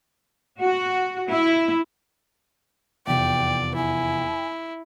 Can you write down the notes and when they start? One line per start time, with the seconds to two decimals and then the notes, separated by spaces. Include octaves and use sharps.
0.59 F#4
1.30 E4
3.07 F1 E2 D5 G5
3.76 E4 G#5